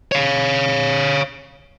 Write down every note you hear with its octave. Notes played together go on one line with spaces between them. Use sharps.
C#5 F5